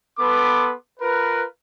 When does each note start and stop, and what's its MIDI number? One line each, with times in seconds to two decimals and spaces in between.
0.19 0.72 59
0.19 0.72 69
0.19 0.72 71
0.19 0.72 84
0.19 0.72 86
1.00 1.43 65
1.00 1.43 70
1.00 1.43 71